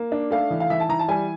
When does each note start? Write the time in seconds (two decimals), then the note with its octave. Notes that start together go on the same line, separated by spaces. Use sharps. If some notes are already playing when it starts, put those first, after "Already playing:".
Already playing: A#3
0.12 D4
0.31 A3 F5
0.51 E3
0.60 F5
0.70 E3 E5
0.80 A5
0.89 E3 A#5
0.99 A5
1.08 G3 G#5